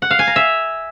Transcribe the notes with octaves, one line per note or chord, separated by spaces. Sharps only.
F#5
F5
G#5
A#5
E5